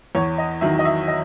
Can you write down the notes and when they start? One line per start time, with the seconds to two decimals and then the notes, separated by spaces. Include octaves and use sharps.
0.15 E2 C#5
0.38 D#5
0.61 D#3 F#3 E5
0.79 D#5
0.85 E5
1.08 D#5